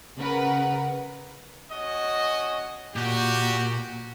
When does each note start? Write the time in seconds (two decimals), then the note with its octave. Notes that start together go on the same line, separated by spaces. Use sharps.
0.19 C#3 A#4 B4 F#5
1.71 C#4 F#4 D#5
2.96 A#2 F#4 G4